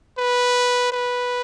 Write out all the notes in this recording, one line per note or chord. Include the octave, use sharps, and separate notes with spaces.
B4
B4